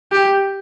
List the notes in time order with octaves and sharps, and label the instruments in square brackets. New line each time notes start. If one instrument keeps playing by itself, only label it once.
[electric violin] G4